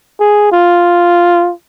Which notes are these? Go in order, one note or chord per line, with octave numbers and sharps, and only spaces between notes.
G#4
F4